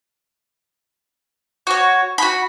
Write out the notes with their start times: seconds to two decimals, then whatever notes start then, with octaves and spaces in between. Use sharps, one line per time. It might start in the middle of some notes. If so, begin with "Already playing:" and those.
1.67 F#4 C#5
2.18 F#4 B5